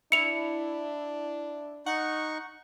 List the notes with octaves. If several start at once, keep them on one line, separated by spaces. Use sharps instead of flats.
D4 E4 C#7 F7
D#4 F#5 C#6